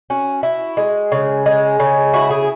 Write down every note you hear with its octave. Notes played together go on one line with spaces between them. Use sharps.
C#4 F#4
E4
G#3
C#3
G#3
C#3
E4 F#4
G#4